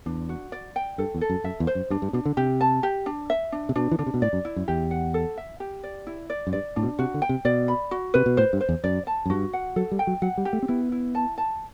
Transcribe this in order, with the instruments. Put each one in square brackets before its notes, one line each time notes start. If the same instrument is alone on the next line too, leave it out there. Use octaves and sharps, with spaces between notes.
[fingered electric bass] E2 [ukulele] D4
[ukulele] F#4
D5
G5
[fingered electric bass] G2 [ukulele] A4
[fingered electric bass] E2
[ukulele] A4
[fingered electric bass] F#2
[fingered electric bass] F#2 [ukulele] E5
[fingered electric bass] E2
[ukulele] C5
[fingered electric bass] F#2
[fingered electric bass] G2 [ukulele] D4
[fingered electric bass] G2
[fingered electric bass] B2 [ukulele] D4
[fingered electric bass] D3
[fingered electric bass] C3 [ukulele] G4
[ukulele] A5
G4
D4
E5
D4
[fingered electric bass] C3
[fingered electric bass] B2 [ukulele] D4
[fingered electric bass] E3
[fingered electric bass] D3 [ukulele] D4
[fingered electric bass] C3
B2
[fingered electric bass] A2 [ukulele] D5
[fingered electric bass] F#2
[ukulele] E4
[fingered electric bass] F#2
[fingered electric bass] E2 [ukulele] G4
[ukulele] F#5
A4
E5
G4
D5
E4
D5
[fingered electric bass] F#2
[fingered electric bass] G2 [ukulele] D5
[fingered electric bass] A2 [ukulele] D4
[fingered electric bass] B2
[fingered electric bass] C3 [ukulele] F#4
[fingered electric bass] D3
[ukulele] G5
[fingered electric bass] C3
[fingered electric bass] B2 [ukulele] D5
[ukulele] B5
F#4
[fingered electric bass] C3 [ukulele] B4
[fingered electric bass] B2
[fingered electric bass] A2 [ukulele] C5
[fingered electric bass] G2
[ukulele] C5
[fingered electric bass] E2
[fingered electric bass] F#2 [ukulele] D5
[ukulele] A5
[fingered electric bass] F#2
[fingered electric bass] G2 [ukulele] F#4
[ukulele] F#5
[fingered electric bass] F#3 [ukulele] A4
[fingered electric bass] G3
[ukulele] G5
[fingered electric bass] F#3
[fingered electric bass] F#3 [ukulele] F#5
[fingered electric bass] G3
[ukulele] G4
[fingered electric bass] A3
C4
[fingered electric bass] B3 [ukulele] E4
[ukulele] E4
A5
A5